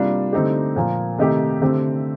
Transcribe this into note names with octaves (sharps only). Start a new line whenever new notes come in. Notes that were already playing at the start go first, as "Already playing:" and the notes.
Already playing: C3 G3 A#3 D4 F4
D3 A3 C4 D#4 G4
A#2 F3 A#3
C3 D#3 A3 D#4 G4
D3 A3 C4 G4